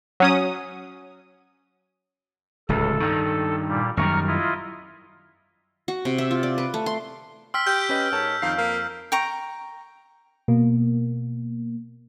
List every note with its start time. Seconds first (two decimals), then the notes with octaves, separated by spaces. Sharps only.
0.20 F#3 C#4 D#6
2.69 D1 C#2 A4
3.00 G2 D#3
3.68 A#2 G3
3.97 F#2 D#3 G3 A#5 C#6 F6
4.27 E4 F4 D#5
5.88 F#4
6.05 C3
6.18 E5
6.31 F4
6.43 D5
6.58 B4
6.74 A3
6.86 C6
7.54 G5 C6 E6 F6 B6
7.67 G4 G6 D7
7.89 C#4 B4 D#5
8.12 G#2 A#4 C#5 A5
8.42 F2 D#3 F5 C7
8.58 A#3
9.12 G5 A#5 C#6
10.48 B2 A#3